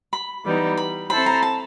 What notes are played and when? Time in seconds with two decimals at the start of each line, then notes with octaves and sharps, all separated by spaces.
0.13 B5
0.45 E3 G3 B3 D#4
0.77 B5
1.10 C4 E4 A4 C5 B5
1.26 A#5
1.42 A5